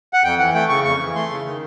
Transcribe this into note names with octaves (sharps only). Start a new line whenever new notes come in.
F#5
F2 G5
E3 F#5
A3 G5
C#3 C#6
F2 C#6
E3
A3 C6
C#3
D#3